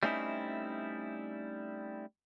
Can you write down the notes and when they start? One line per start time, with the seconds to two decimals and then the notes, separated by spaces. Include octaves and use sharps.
0.03 G3 A3 C4 C#4 D#4 E4